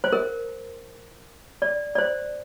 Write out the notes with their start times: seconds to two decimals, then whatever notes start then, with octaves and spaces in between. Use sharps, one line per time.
0.04 C5
0.13 A#4
1.62 D5
1.95 D5
1.98 C5